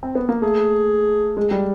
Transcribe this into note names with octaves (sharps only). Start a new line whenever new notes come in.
C4
B3
A#3
A3 G#4
G#3
G3